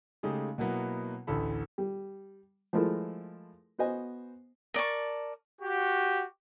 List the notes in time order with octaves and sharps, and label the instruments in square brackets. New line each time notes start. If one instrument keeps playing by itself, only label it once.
[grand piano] C#3 G#3 A3 D#4 G4
B2 F#3 A#3 B3 E4
A1 D2 E3 A4 B5
[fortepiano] G3
F3 G#3 A3 E4 A#4
B3 F#4 C5 D#5 G#5
[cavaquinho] A#4 D5 A5 C#6
[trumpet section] F#4 G4